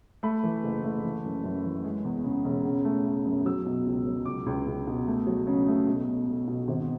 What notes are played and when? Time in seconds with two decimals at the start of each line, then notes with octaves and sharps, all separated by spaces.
0.23 A3 B5
0.44 E3
0.64 F#1
0.84 A3
1.03 E3
1.24 F#2
1.44 F#2
1.64 E3
1.84 G#3
2.05 E2
2.24 C#3
2.44 E1
2.65 C#3
2.85 A3
3.05 A3
3.26 F#2
3.46 F#3 E6
3.66 B2
3.86 C#2
4.06 F#3
4.25 C#2 D6
4.46 C#2
4.66 C#2
4.87 B2
5.07 A3
5.27 F#3
5.47 C#3
5.68 A3
5.87 B1
6.08 B1
6.27 B1
6.47 B2
6.68 G#1